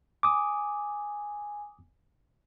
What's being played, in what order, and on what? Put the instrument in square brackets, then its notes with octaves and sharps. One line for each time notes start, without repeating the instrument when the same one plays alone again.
[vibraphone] G#5 [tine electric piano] D6 D#6